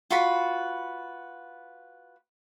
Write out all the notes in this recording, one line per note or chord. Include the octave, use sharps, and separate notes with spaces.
F4 F#4 B4 B5